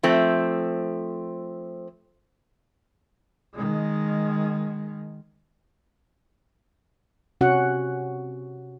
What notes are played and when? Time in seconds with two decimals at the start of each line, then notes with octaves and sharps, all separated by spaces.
0.03 F3 A3 C4
3.54 D#3 G#3
7.41 C3 C#4 F#4 F#5